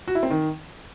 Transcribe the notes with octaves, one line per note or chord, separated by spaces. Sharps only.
F#4
E4
C4
D#3